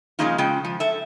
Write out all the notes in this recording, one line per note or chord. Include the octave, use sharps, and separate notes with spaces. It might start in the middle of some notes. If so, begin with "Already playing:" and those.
C#3 F3 G#3 A#3 D#4 F4
C#3 G#3 F4 G5
F3
A4 E5